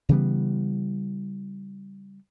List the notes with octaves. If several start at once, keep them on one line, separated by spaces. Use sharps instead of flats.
C#3 E3 G3 B3